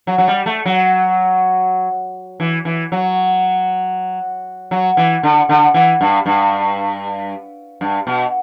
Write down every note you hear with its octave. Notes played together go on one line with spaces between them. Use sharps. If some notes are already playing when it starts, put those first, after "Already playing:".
F#3
F#3
G3
A3
F#3
E3
E3
F#3
F#3
E3
D3
D3
E3
G2
G2
G2
B2